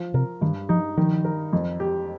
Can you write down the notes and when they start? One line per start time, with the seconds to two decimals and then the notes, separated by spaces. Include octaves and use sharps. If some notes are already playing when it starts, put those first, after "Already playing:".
Already playing: F3
0.14 C3 A#4
0.41 G2 D#3
0.69 F3 D#4
0.97 D#3 F3
1.25 A#4
1.53 F2
1.80 G4